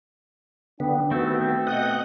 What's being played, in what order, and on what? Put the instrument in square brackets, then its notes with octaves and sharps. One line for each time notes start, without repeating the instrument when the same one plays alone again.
[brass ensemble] F#1 D4 G5 [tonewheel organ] D3 B3
[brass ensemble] D#3 G3 F#4 [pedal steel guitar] A3 C4 [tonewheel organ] B3
[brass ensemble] B2 [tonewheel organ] D#5 F#5